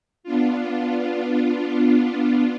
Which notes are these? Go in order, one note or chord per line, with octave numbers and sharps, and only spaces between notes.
B3 D4 F4